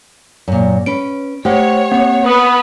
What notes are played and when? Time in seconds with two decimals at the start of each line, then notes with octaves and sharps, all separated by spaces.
0.48 F#2 A#2
0.86 C#4 B4 D7
1.45 A3 G4 C5 C#5 F#5
1.92 A#3 C4 F#5
2.26 B3 B4 D#6